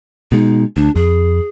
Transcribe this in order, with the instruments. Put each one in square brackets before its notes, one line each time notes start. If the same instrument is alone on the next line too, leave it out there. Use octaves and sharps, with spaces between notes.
[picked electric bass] B2 G#3 [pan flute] D#4
[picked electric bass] D2 [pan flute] D4
[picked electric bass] F2 [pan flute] G#4